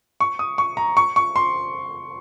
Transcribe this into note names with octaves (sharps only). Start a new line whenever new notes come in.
C#6
D#6
C#6
A#5
C#6
C#6
C6